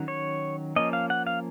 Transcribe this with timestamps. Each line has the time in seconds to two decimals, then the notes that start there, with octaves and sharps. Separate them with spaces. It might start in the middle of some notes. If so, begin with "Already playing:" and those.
Already playing: D#3 F#3 C#4
0.08 C#5
0.76 F3 A#3 C#4 D#5
0.93 F5
1.10 F#5
1.27 F5